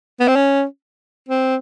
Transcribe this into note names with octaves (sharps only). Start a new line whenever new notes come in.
B3
C4
C#4
C4